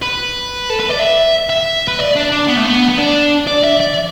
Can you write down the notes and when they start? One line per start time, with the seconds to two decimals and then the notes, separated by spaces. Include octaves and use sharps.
0.02 B4
0.70 A4
0.80 B4
0.90 D5
1.00 E5
1.50 E5
1.88 B4
1.99 D5
2.16 D4
2.32 D4
2.48 B3
2.56 A3
2.65 B3
2.89 B3
2.98 D4
3.47 D5
3.64 E5
3.80 D5